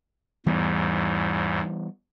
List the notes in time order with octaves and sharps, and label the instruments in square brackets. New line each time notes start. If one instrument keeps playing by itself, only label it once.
[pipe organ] E2 G#2 [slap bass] E3 G3 B3